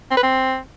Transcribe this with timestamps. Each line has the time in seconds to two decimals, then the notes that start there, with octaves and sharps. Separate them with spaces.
0.11 C4
0.17 B4
0.23 C4